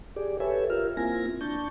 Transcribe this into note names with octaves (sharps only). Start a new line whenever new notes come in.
G4 G#4 D5
G4 A4 B4 C#5 E5 G#5
F4 G4 A#4 E5 F6
A#3 C4 E4 F4 G#5 A#6
D4 A5 C#6 G6